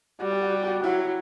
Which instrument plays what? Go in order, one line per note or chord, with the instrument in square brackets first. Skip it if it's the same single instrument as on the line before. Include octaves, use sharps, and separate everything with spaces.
[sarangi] G3 [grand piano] F#4
[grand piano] G4
F#4
G4
G4
F#4
[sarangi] F#3 [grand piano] E4
[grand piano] E4